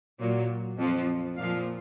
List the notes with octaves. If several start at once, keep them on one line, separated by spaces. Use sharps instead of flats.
A#2 F#3
F2 F3
A#2 F3 F5